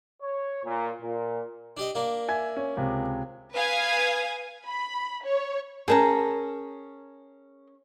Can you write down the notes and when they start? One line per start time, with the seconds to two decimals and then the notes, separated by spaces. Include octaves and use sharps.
0.22 C#5
0.64 A#2
1.01 A#2
1.77 D4 G4 D#5
1.95 A#3 D4
2.28 E5 G#5 G#6
2.57 C#4
2.77 C#2 C3
3.53 B4 F5 G#5 D#6 G#6
4.68 B5
5.24 C#5
5.88 C#4 G#4 A#4 G5 A5 A#5